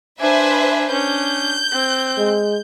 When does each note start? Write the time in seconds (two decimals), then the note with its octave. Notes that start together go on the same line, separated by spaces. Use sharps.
0.20 D4 B4 C5 E5 G#5
0.91 C#4 D4 G6
1.72 C4
2.18 G#3